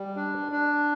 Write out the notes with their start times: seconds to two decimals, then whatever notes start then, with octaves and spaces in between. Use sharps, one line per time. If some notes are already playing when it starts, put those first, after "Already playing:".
Already playing: G3
0.16 D4
0.52 D4